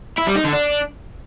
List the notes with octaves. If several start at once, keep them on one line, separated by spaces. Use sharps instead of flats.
E4
G3
D#4
D3
D4